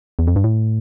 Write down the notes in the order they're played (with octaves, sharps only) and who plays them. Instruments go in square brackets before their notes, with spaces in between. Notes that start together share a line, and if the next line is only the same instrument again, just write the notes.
[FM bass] E2
F2
G2
A2